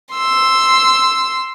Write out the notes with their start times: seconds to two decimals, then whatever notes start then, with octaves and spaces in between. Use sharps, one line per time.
0.13 C6 E6